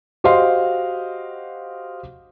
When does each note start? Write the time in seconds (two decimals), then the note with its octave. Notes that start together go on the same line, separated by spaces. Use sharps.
0.24 F#4 G4 C5 D#5 F5 C6